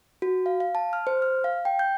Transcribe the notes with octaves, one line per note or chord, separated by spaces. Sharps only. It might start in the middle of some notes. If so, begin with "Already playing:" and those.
F#4
F5
F5
A5
F6
C5
F6
F5
G5
G6